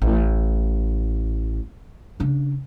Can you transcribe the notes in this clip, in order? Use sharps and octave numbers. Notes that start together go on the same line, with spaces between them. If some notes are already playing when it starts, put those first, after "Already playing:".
A1
C#3 D4